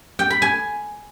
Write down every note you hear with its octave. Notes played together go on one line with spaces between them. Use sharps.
G5
B5
G#5